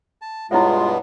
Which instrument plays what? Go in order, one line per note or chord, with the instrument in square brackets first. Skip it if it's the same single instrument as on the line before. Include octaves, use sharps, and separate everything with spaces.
[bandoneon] A5
[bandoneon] G2 B2 B3 [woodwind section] G#3 F4 [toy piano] E4 C#5 E5